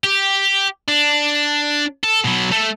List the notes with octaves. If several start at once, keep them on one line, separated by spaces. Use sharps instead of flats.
G4
D4
A4
B2 F#3
A3 A4